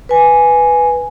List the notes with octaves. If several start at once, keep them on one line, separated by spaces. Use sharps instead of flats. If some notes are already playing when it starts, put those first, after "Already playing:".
B4 G#5